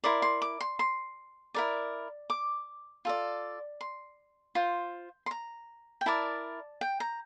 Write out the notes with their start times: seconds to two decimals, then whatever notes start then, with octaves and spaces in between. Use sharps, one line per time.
0.04 E4 A#4 D5 C6
0.22 C6
0.42 D6
0.60 C6
0.79 C6
1.54 E4 A#4 D5
2.30 D6
3.05 F4 A4 D5
3.81 C6
4.55 F4 C5
5.26 C6
5.31 A#5
6.01 G5
6.06 E4 A#4 D5 A5
6.81 G5
7.00 A#5